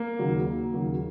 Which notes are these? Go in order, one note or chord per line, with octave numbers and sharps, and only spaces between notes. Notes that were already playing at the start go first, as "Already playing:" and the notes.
Already playing: A#3
D#2 C#3 F#3
D#2 C#3 F#3